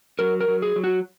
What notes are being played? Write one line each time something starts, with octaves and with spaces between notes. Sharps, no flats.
F#3 A#4
A#4
F#3
G#4
F#3
F#4